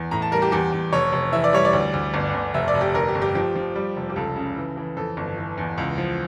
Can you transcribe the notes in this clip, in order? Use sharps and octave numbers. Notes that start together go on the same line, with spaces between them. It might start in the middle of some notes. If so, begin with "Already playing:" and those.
Already playing: E2
A2 A#5
A5
G3 A#4
G4
E2 G4
E2
F1 C#5
F1
E3 E5
D5
G3 C#5
D5
D2
D2
G1
G1
F1 E5
D5
F1
G4
G1 A#4
G4
G1
G4
F3 G4
F3
G3
F1
G4
C#2 A4
C#3
E3
E3
F2 A4
G1
E3
E2
C#2
F3